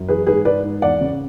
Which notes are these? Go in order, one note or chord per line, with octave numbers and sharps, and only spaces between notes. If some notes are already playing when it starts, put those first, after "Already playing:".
Already playing: F#2
E3 G#4 B4
G#2 G#4 B4
G#2 B4 D5
G#2
E2 D5 F#5
C#3